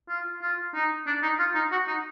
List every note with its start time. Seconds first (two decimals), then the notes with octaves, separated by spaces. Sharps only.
0.09 F4
0.42 F4
0.74 D#4
1.07 D4
1.23 D#4
1.39 F4
1.55 D#4
1.72 F#4
1.88 D#4